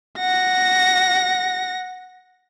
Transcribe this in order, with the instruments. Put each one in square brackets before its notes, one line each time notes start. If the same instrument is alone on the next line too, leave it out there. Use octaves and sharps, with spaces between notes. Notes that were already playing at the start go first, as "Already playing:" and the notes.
[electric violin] F#5 A#6